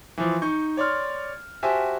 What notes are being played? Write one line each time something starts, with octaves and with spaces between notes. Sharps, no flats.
E3 F3
D#4 C#6 G6
C#5 D5 C6 F6
F#4 G4 C5 E5 G#5 A5